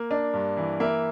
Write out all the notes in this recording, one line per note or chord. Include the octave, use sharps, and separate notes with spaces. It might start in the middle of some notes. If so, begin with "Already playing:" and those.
Already playing: A#3
D4
G2
E3
A#3 E5